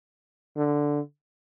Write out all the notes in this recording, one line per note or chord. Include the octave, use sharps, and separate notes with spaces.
D3